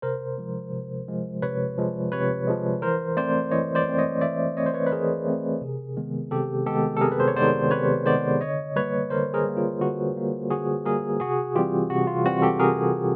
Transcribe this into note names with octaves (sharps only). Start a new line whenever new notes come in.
C3 A#4 C5
F3 G#3
C3
F3 G#3
C3 B4 C#5
F3 G#3
C3 B4 C#5
F3 G#3
E3 A#4 C5
A3 C4 C5 D5
E3 C#5 D#5
C5 D5
A3 C4
C#5 D#5
E3 D5 E5
A3 C4 C#5 D#5
C5
B4 C#5
B4
E3 G#4 A#4
A3 C4
C3
D#3 G#3 B3
C3 G4 A4
D#3 G#3 B3 G4 A4
A4
C3 G#4 A#4
B4
C5
C#5
D#3 G#3 B3 C5 D5
C3 B4 C#5
D#3 G#3 B3 C5 D5
D3 C#5 D#5
G3 A#3 B4 C#5
D3 A#4 C5
G#4 A#4
G3 A#3
F4
D3 F#4
G3 A#3
D3 F#4 G#4
G3 A#3 G#4 A#4
C3 F#4 G#4
E3 G3 C4 F4 G4
C3 F#4
F4
E3 G3 C4 F#4
G4 A4
C3 G#4 A#4